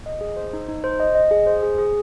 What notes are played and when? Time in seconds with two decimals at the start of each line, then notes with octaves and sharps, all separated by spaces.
0.06 D#5
0.21 G#4
0.36 C5
0.53 D#4
0.68 D#4
0.84 C5
1.00 D#5
1.15 D#5
1.31 G#4
1.47 C5
1.63 G#4
1.78 G#4